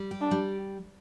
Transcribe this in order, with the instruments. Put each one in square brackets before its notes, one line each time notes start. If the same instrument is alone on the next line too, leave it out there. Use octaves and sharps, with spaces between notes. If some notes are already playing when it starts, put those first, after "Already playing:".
Already playing: [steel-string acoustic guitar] G3
G4
[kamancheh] D4
[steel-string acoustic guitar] G3